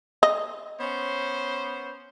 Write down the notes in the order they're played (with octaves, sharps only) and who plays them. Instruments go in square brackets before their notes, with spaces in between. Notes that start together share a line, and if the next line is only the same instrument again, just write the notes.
[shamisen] D#5
[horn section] B3 C#4 C5